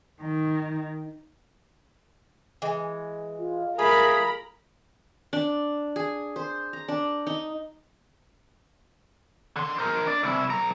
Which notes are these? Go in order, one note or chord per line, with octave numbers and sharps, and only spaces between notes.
D#3
E3 G#3
F4
A3 G#4 A#4 A#5 B5
D4
G#4
C5
A#5
D4
D#4
D3 C6
A#4 C5
D4 D5
C2 E4
B1 A#5